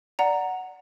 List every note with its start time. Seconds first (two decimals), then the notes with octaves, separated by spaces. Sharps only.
0.19 D5 F#5 A#5